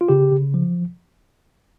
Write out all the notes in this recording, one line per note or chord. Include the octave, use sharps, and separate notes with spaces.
F4
C#3 G4
C#3
F3